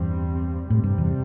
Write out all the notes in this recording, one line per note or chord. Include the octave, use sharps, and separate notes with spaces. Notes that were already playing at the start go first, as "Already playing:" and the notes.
Already playing: E2 G2 G3 C4
A2 C3 G3 C4
G2
E2